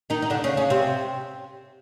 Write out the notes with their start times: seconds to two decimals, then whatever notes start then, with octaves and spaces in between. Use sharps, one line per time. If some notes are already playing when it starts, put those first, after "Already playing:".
0.10 D#3 D#4
0.22 D#4
0.30 D3 D4
0.44 C#3 C#4
0.57 C#3 C#4
0.70 C3 C4